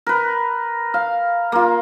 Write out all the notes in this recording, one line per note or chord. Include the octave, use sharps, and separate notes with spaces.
A#4 B4
F5
A#3 F4